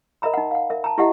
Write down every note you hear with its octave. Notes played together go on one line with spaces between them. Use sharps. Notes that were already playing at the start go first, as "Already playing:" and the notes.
A#4 D#5 E5 A#5 B5
D#4 F#5
F5 F#5
A#4 E5
A5 A#5
E4 G4 D#5 E5 F#5